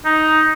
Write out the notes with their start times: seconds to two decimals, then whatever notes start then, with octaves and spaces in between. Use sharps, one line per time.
0.05 D#4